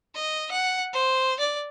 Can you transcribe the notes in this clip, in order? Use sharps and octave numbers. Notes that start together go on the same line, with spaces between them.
D#5
F#5
C5
D5